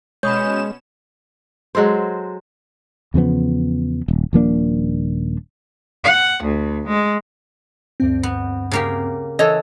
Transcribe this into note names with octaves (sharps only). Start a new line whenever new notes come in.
B2 G#3 C#4 C#5 B5 D#6 G6 E7
F#3 G#3 A4 C5
E2 C#3 F3 B3
D#1
D#1 F3 A#3 D4
F#5
D2
G#3
D2 G2 C4
B3
C#3 A#3 G4
E3 A4 C#5 D#5